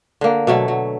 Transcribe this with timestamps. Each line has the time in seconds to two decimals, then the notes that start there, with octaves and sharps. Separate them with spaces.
0.21 D3 A#3
0.47 B2 F#3 A3
0.68 F#3